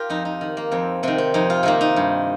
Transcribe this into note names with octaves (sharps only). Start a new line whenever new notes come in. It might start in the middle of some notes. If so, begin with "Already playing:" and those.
Already playing: F4 G4 A#4
F2 D#4
D#4
D#3
A#3
F2 C4
C3 D#3 C4
C4
F2 D#4
F4
C3 D#3 A#3
D#4
G2